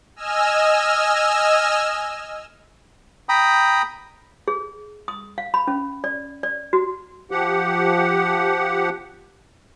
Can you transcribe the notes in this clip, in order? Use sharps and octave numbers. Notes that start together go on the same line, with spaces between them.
D#5 G#5 E6 F6
G5 A#5 B5 D#6
G#4
D#6
F5
B5
C#4
D5
D5
F#4
F3 G4 F#5